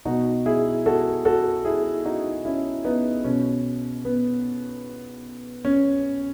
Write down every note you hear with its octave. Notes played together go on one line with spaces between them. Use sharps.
B2 D#4 F#4
E4 G#4
F#4 A4
F#4 A4
E4 G#4
D#4 F#4
C#4 E4
B3 D#4
B2 C#4
B3
C#4